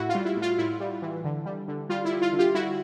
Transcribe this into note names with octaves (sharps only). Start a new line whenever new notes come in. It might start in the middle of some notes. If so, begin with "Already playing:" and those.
Already playing: A2 E4 F#4
F4
G3
E4
A2
F4
A2 E4
G3
E3
D3
G3
D3
G3 F4
E4
G3
F4
D3
F4 G4
G3 E4 F#4